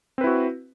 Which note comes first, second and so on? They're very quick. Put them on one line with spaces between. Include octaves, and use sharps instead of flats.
C4 B4 E4 F#4